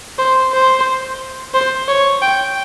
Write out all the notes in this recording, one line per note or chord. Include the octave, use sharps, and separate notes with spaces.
C5
C5
C5
C#5
G5